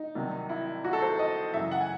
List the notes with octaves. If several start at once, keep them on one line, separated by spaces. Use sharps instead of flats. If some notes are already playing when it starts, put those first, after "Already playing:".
Already playing: D#4
C2 C3 D#3 F#3
E4
F#4
A4
C5
D#5
F#2 C#3 E3 E5
F#5
G#5